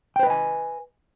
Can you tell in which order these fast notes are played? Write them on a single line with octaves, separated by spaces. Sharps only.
G5 C5 B4 D#5 G#5